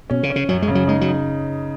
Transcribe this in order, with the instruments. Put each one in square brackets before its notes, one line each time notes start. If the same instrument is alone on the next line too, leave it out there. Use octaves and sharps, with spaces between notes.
[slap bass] B2 [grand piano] C#4
[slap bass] C#3
[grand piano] C#4
[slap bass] C#3
[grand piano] F#2 [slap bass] F#3
[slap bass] G#3
[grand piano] C#3
[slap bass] F#3
[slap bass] G#3 [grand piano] D#4
[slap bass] F#3
[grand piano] D#4